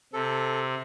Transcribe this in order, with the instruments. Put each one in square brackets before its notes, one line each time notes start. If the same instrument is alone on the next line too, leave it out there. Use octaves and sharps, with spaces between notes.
[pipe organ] C3 [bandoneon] A4